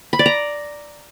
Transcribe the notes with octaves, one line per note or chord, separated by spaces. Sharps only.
B5
D5
A#5